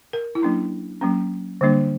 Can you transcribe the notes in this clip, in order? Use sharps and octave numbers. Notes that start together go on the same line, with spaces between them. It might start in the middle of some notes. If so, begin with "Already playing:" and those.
A#4
E4
F#3 A#3 C#4 D4
F#3 A#3 C#4
D3 G3 A#3 D4